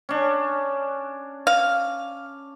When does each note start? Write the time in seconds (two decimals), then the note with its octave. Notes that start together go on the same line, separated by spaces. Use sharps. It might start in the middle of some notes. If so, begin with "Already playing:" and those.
0.09 C#4 D4
1.47 F5